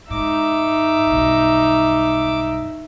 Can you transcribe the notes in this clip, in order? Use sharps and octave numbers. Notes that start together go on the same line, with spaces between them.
G#2 D#4 E5 D6
B1 G2